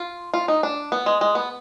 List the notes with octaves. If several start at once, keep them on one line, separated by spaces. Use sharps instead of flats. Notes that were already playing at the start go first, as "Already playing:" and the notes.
Already playing: F4
F4
D#4
D4
B3
G#3
G#3
B3